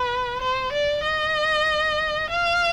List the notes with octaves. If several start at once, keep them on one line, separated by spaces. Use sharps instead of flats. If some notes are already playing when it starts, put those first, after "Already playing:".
Already playing: B4
C5
D5
D#5
F5